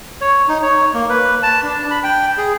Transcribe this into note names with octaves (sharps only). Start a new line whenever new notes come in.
C#5
D#4
C#5
A#3
B4
A5
D4
B5
G5
G#4